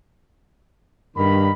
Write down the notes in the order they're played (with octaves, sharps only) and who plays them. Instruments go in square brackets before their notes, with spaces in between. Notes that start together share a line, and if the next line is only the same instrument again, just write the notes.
[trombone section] G2 [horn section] D#3 B5